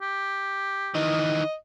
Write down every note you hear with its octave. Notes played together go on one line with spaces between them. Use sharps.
G4
D#3 E3 D#5